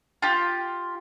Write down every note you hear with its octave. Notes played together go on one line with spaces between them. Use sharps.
F4 G4